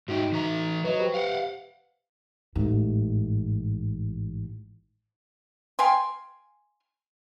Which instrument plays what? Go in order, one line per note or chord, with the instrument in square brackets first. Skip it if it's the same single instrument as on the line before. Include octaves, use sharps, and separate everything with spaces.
[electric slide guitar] G#2 E5 G5 [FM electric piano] D#4 F#4
[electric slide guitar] E3 E5 A#5
[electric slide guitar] F#3 [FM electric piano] B4 D#5
[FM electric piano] G4 B4 C5
[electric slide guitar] F5 F#5
[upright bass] A1 G#2
[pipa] F5 G5 G#5 C6